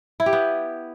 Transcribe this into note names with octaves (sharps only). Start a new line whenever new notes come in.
E4
G4
B3